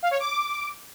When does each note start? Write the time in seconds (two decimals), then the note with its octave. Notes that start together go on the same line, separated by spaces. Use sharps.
0.03 F5
0.11 C#5
0.19 D6